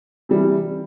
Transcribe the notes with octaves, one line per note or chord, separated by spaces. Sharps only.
C3 E3 G3